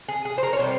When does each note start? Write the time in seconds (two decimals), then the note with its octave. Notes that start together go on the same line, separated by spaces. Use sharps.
0.08 G#4
0.25 G#4
0.38 C5
0.43 A#4
0.53 C#5
0.59 C3 G3 C5